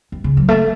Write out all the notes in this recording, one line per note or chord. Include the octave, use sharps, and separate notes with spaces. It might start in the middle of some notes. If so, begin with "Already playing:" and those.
G2
C#3
F#3
A3